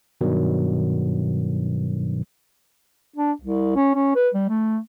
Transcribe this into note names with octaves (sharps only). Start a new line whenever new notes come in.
G2 B2 D#3 F#3
D4
C2
C#4
C#4
B4
G3
A3